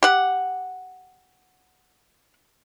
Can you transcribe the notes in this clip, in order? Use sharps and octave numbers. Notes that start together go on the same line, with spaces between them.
G4 F#5